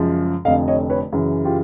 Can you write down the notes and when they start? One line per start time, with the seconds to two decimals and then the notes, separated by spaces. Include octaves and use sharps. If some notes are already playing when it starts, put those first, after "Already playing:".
Already playing: F#2 C#3 F3 G#3
0.45 F1 F2 D3 D#5 F5
0.68 C#5 D#5
0.90 B4 C#5
1.12 F#2 C#3 E3
1.45 F4 G4